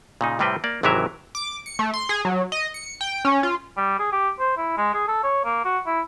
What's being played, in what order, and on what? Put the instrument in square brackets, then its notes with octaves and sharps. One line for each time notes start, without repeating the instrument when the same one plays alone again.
[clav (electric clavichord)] A#2 C#3 D#4
A2 C3 G3 C4 B4 G5
A#3 D5
G#1 C3 E3 F#3 A#4 E5
[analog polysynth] D6
C#7
A3
C6
G#4
F#3
D#5
C#7
G5
C#4
F4
[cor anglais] G3
G#4
G4
C5
E4
G#3
G#4
A4
C#5
A#3
F#4
E4